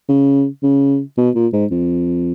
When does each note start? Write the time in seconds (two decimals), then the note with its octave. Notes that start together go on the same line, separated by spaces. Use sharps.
0.09 C#3
0.63 C#3
1.17 B2
1.35 A#2
1.53 G#2
1.71 F2